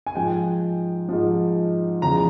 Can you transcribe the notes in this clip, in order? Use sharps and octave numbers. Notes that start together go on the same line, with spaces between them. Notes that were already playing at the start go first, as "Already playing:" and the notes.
G#5
G#2 F3 G5
G#2 F3
E2 C#3 F3 A#5